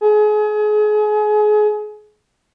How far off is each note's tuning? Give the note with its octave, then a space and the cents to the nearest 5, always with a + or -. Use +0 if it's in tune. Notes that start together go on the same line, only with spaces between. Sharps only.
G#4 +30